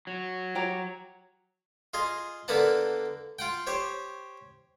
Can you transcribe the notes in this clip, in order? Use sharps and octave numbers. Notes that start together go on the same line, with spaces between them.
F#3
G4 C#5 A#5
F4 G#4 D#5 C6
D3 A#3 B3 B4 F#5 A5
F4 F#5 G5
G4 C5 C#5